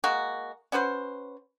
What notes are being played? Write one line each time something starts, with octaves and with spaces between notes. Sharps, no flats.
G#3 A#3 F#4
C#4 F#4 B4 C5